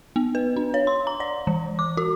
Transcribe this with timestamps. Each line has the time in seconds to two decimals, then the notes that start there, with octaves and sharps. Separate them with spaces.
0.16 B3
0.35 B4
0.56 D4
0.74 C#5
0.87 C6
1.07 A#5
1.20 D5
1.47 E3
1.79 D6
1.97 F#4